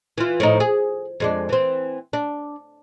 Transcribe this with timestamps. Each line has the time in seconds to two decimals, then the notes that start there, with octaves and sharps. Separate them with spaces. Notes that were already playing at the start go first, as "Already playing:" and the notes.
0.18 E3 F4
0.40 A2 F3 D#4
0.60 G#4
1.20 F2 G#3 D4
1.49 E3 C4
2.13 D4